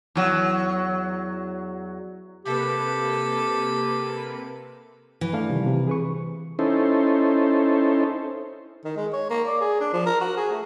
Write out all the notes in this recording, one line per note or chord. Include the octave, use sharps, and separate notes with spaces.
E2 F#3
C3 A#3 G4 A4 B4
E3
A3 D4 F5
C3 D#3 G3
C3
G#4 B4 C#6
C#4 D#4 E4 A4 C5
D#3
G#3
C#5
A#3
D5
G#4
D4
F3
A#4
F#4
G#4
A3